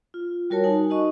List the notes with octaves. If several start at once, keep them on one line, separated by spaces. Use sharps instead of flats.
F4
G3 F#4 A#4 C#5 A5
D#4 G#5
D#4 F#4 D#5 C#6